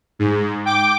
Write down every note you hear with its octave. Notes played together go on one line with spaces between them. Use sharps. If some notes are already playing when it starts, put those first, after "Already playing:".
G#2
G5 D6 D7